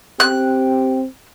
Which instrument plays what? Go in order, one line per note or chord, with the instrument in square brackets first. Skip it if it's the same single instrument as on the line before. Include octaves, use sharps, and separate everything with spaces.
[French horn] C4 [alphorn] G4 [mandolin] F#6